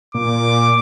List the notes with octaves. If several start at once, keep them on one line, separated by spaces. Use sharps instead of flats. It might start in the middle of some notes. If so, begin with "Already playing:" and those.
A#2 D6